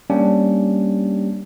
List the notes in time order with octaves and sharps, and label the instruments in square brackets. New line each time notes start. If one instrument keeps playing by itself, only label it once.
[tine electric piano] G3 A#3 C#4 D4 G4